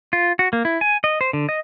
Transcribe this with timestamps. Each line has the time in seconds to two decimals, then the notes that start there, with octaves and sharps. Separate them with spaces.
0.13 F4
0.39 F#4
0.53 A#3
0.65 E4
0.81 G#5
1.04 D#5
1.21 C5
1.33 D3
1.49 D#5